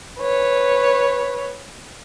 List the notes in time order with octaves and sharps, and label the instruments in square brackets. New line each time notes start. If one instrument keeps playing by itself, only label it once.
[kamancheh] B4 C#5